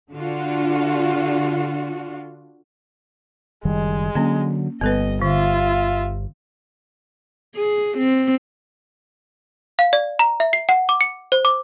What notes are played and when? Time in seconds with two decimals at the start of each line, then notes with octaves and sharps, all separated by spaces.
0.11 D3 D4 F4 F#4
3.65 F#1 D#3 G3 G#3
4.15 D3 F#3 A#3 C#4
4.81 G1 G3 B3 A4 B4 D#5
5.22 D3 F4 E5
7.56 G#4
7.98 C4
9.79 F5
9.93 D5
10.19 A#5
10.40 E5
10.53 C7
10.69 F#5
10.89 D6
11.01 C#7
11.32 C5
11.45 D6